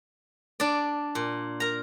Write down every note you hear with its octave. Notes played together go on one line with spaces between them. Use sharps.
D4 D5
A#2
A#4 A#5